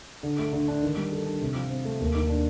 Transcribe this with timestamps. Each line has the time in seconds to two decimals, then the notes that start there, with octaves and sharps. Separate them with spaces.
0.23 D3
0.39 A3
0.53 D3
0.68 D4
0.82 D#3
0.97 G3
1.12 A4
1.26 D4
1.42 C3
1.55 F3
1.70 C4
1.85 A3
2.00 D#2
2.15 D#3
2.29 D4